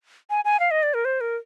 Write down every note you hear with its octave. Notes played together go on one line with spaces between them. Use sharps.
G#5
G#5
F5
D#5
D5
A#4
C5
A#4